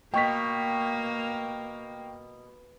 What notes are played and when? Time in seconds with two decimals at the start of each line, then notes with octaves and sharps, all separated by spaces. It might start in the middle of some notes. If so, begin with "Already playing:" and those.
0.14 B2 A#3 G5 C#6 B6